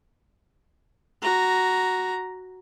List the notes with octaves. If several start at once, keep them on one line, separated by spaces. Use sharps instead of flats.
F#4 A#5